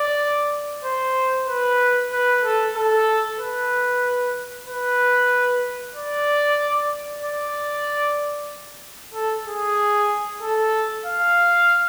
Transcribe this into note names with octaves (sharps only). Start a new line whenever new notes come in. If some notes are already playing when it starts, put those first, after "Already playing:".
Already playing: D5
C5
B4
B4
A4
A4
B4
B4
D5
D5
A4
G#4
A4
F5